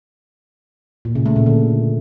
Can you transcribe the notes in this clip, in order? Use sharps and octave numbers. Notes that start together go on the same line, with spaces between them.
A#2
C#3
A3
A#2
D3